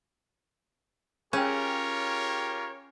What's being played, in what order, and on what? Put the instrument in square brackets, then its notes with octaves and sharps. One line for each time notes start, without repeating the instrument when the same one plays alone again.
[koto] C#4 [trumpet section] F4 G4 A#4 [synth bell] G#4 G5 [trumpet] C#5